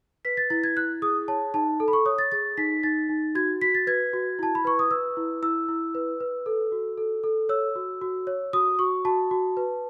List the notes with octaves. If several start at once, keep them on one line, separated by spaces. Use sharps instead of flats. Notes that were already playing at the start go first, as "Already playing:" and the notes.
B4 B6
A6
E4 A6
G#6
E4 F#6
G#4 D#6
C#5 A5
D#4 A5
A4
B5
C#6
C#5 D#6
A6
G#4 A6
D#4 B6
D#4 A6
D#4
F#4 G#6
F#4 B6
A6
B4 G#6
F#4
E4 A5
B5
B4 C#6
D#6
B4 E6
E4
E4 E6
E4
B4
B4
A4
F#4
A4
A4
C#5 E6
F#4
F#4
C#5
F#4 D#6
F#4 C#6
F#4 A5
F#4
B4